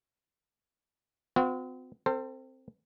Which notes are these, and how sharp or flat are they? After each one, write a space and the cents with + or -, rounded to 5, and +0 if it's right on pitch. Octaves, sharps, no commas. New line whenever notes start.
C4 -40 F#4 -45
C4 +0 A4 +40 C5 +0